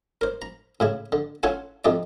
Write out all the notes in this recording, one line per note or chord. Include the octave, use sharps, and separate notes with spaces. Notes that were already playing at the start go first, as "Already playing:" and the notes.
A#4 C5
A#5
A2 C#3 E4
D3
C#4 E4 F4 A4 F#5 G#5
F2 C3 D#4 D5